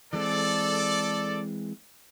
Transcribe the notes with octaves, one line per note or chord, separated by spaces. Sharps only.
E3 G#3 C4 A4 D5